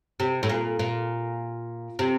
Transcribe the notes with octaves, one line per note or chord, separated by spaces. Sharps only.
C3
A2
A#2
A#2
C3